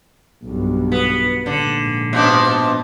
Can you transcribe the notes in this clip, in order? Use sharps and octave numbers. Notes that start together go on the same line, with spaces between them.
B1 G2
B3
A#1 G#2 D3
B2 F3 D4